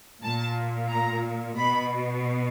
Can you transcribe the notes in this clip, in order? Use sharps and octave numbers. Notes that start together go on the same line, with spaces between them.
A#2 A5
A#5
B2 B5